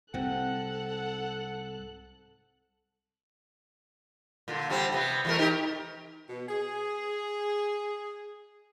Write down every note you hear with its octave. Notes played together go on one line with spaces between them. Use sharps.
C2 G#2 C4 A4 F#5 F#6
A#2 D3
D3 G3 C4
C3 B3
E2 A3 A#4
D#4 G4 A#4
B2
G#4